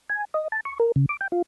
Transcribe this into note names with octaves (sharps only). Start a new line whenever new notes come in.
G#5
D#5
A5
C#6
A#4
C#3
D6
G5
F4